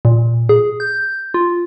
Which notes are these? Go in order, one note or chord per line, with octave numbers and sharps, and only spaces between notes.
A#2
G#4
G6
F4